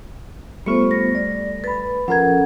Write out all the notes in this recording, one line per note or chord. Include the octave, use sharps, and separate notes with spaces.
G3 A3 B3 F4 C5 C#6 C#7
A#6
D5
B4 B5 A6
F3 C#4 A4 A#4 F#5 G#6